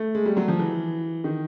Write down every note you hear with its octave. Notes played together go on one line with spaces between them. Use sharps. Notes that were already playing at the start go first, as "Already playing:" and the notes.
Already playing: A3
G#3
G3
F#3
F3
E3
D#3